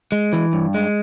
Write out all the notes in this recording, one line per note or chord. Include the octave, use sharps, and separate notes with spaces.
G#3
E3
G2
G#3